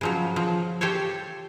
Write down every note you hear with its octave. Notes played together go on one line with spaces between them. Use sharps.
C#3 F3 F#3
F3
G4 A4 C5 C#5